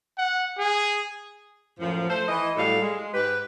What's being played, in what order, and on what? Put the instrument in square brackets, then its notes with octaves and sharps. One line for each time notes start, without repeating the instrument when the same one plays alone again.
[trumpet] F#5
G#4
[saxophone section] F#2 A2 F3
A3 A4 C5
E3 D#5
A2 F#3 G3 A4 F5
G#3
G#2 G4 B4